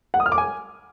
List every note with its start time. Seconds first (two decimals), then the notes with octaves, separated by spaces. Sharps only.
0.14 F#5
0.20 D#6
0.26 F6
0.32 D6
0.38 G#5